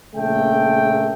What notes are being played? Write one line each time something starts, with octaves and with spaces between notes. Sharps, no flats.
A#1 C#3 A3 A#3 G5